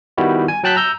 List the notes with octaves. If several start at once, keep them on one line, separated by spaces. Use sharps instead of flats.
D#3 G3 B3 E4 F#4
G#5
F#3 G5 A5 F#6 G6 B6
A#5 E6 G6